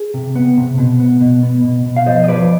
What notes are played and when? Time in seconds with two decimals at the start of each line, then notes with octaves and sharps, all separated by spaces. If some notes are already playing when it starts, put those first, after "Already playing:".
Already playing: G#4
0.14 C3
0.36 B3
0.57 C3
0.78 B2
1.00 B3
1.21 B2
1.43 B3
1.64 B2
1.86 B2
1.96 F5
2.06 F3 C5 D#5
2.24 D#5
2.28 F3 B4 D5